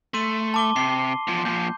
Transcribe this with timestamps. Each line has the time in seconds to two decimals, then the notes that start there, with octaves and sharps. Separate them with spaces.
0.14 A3 C6 D#7
0.54 A5 D6 G7
0.76 C3 C7
1.27 E2 F3
1.45 A#2 F3 G6